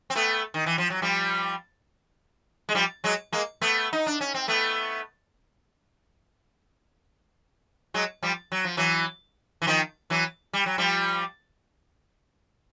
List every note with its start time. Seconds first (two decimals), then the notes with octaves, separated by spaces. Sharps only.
0.10 C4
0.15 A3 B3
0.54 D#3
0.66 E3
0.78 F3
0.90 F#3
1.02 F3 G3
2.69 G#3
2.75 F3 G3
3.04 F#3 G#3
3.32 G#3 A#3
3.61 A3 B3
3.93 D#4
4.07 D4
4.21 C#4
4.34 C4
4.48 A3 B3
7.94 F#3 G#3
8.23 F3 G3
8.52 F#3
8.64 F3
8.77 E3 F#3
9.62 E3
9.67 D#3 F3
10.10 E3 F#3
10.53 G3
10.66 F#3
10.78 F3 G3